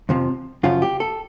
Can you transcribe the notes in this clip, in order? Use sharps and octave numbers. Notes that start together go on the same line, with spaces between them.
F2 C3 F3
F#2 C#3 F3 F4
G4
A4